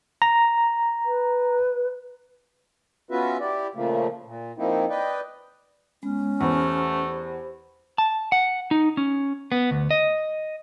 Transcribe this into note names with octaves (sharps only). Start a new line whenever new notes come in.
A#5
B4
B3 C#4 F4 F#4 B4 E5
E4 G4 D5
A#2 C#3 F3 A3 A#3
A#2
F3 A#3 C4 D#4 E4
B4 D5 D#5 G5
G#3 B3 C#4
E2 A3 G4 C5 B5
A5
F#5
D#4
C#4
B3
D2
D#5